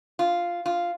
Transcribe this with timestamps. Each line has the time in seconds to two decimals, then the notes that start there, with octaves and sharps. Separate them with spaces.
0.19 F4
0.66 F4